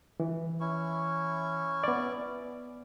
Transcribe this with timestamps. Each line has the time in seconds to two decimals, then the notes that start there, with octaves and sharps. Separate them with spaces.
0.20 E3
0.60 C#4 E4 C#6
1.84 B3 D5